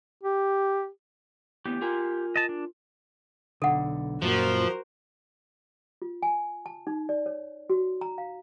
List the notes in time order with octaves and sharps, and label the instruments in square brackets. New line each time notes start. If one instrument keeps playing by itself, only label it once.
[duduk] G4
[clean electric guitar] D2 E3 B3 [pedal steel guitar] G4
[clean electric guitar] F4 A#4 G#5
[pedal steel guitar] D#5 A5
D4
[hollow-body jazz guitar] B1 D3 [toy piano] A4 F#5
[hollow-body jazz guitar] F#2 A#2 [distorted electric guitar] F3 [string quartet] F#4 A#4 C5
[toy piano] F4
G#5
A5
D#4
D5
C#5
F#4
A#5
F5